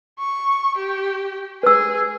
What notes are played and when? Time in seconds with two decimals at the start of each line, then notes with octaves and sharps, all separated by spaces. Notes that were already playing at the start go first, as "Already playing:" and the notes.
0.19 C#6
0.77 G4
1.63 G#4 B4 E6